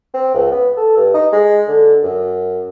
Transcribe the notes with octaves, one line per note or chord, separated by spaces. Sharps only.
C4
C#2
B3
A4
G2
D#4
G#3
D3
F#2